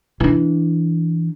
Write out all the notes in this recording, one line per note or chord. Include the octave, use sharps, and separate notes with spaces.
E3 D4